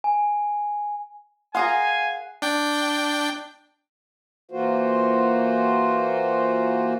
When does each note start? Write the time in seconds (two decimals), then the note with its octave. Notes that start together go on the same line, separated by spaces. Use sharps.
0.04 G#5
1.55 F4 G#4 A#4 F5 F#5 G#5
2.42 D4 G5
4.51 E3 A#3 F4 F#4 C5